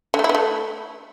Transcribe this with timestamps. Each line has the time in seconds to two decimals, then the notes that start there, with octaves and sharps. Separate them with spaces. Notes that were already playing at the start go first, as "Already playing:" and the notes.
0.14 D3
0.19 A3
0.24 E4
0.29 B3
0.35 A3